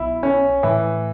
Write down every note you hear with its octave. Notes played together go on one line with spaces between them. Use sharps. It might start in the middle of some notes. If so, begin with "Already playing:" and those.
Already playing: B1 B2 E4
C#4
A2 E3 A3